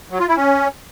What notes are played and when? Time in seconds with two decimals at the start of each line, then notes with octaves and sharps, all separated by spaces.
0.11 F#3
0.20 F4
0.28 E4
0.37 C#4